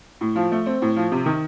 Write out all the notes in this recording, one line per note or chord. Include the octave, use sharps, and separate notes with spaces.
A2
F3
A3
C4
A2
F3
C3
D#3